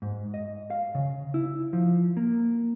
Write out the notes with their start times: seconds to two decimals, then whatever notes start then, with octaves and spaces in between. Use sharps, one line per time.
0.02 G#2
0.34 D#5
0.70 F5
0.95 C#3
1.34 E4
1.73 F3
2.17 A#3